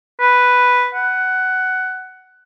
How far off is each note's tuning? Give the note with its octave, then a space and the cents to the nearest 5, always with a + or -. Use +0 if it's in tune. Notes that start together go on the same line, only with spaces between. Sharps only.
B4 +0
F#5 +10